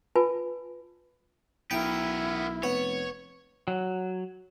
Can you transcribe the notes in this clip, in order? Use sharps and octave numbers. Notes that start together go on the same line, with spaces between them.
F4 B4 G#5 A5
B1 B3 E4 A#4 G5
F1 B3 C#5
F#3